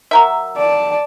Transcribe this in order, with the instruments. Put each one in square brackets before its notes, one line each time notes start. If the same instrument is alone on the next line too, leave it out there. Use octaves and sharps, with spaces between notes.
[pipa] F#3 A#4 E5
[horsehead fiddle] D5 A5